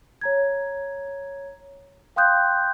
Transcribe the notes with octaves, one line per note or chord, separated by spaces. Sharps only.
C#5 A#5 G#6
F5 G5 C6 D#6 F#6 G6